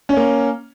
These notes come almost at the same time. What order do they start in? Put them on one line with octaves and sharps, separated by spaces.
C#4 C#5 A#3